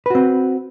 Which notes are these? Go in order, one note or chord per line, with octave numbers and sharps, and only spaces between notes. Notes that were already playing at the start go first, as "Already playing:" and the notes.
C4 F#4 B4